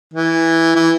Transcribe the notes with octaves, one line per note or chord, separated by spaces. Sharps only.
E3
E3